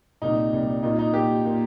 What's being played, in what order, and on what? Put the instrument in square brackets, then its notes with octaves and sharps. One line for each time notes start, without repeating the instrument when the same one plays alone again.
[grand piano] C2 A#2 G3 [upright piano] D#4
[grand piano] C2 A#2 G3
[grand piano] A#2 A#3 F4 [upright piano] D#4
[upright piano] D#4
[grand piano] A#2 A#3 F4 [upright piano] G4
[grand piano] A#2 A#3 F4